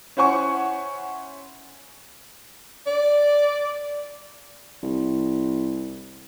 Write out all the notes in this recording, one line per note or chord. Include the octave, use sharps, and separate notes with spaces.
C#4 E4 C5 F#5 G#5 C#6
D5
C2